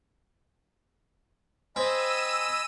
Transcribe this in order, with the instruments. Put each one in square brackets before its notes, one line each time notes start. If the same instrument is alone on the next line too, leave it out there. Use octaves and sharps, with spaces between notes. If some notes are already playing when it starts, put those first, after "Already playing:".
[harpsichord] C4 [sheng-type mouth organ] D#5 G#5 B5 [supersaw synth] E6 D#7